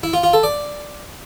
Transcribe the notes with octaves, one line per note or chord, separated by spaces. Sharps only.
E4
F4
F4
A4
D5